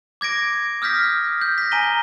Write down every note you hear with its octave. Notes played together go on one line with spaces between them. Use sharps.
D6 G#6 A#6 D7
D#6 F6 G6 A#6 B6
G6
A#6 B6
G#5 A#5 D#7 G7